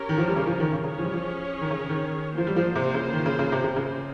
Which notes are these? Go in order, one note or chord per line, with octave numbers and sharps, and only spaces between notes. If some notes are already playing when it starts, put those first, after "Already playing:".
Already playing: C#4 G4 A#4 C#5
D#3
F3
G3
C#3
F3
D#3
C#3
C#3 C#4 G#4 C#5
F3
G3
F3
D#3
C#3
D#3
F3 A#3 F4 C5
G3
F3
C3
C#3
D#3
C#3
C#3
C3
C3
C#3